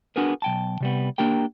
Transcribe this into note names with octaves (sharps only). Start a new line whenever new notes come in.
B3 D4 F#4 G#4 A#4 B4
B1 G5 A5
C3 G3 B3
A#3 D4 G4 A#4 G5